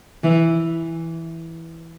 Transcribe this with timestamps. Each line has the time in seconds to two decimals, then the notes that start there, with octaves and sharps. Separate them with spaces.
0.24 E3